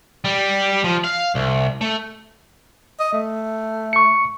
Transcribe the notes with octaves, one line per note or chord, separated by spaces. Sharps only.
G3
F3
F5
C2
A3
D#5
A3
C#6 C#7